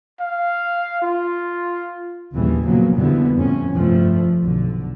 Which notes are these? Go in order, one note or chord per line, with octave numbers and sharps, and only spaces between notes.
F5
F4
A#1 D#2 C#3 E3 G3
A#2 C#3 F3 F#3 A#3 B3
F2 A#2 D3 E3 G3 B3
F2 A2 C#4
F1 G2 F3 A3
B1 D3